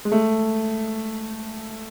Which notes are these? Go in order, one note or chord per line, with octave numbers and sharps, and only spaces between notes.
G#3
A3